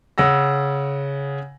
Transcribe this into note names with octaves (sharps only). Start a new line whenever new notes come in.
C#3 F#5 E6 A#6